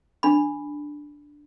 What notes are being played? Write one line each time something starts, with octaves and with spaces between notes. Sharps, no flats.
D4 B5